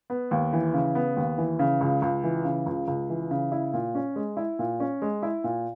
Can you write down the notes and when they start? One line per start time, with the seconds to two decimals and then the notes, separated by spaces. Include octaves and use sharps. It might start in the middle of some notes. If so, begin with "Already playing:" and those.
0.10 B3
0.31 D#2
0.53 E3
0.74 C#3
0.95 B3
1.17 D#2
1.38 E3
1.59 C#3
1.81 C#2
2.02 C#2
2.24 E3
2.44 C#3
2.66 C#2
2.88 C#2
3.09 E3
3.31 C#3
3.52 E4
3.73 A#2
3.95 C#4
4.16 G#3
4.37 E4
4.59 A#2
4.80 C#4
5.02 G#3
5.23 E4
5.44 A#2